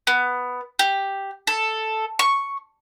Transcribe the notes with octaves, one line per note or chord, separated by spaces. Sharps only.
B3
G4
A4
C#6